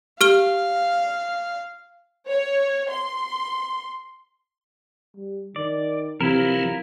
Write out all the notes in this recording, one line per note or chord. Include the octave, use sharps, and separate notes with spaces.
G4 F5 F6 G7
C#5
C6
G3
D#3 D5
C3 E3 F#3 C4 E4 F4 A#4